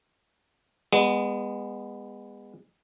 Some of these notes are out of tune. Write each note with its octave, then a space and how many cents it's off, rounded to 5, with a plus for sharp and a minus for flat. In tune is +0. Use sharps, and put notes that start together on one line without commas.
G#3 -30 B3 +0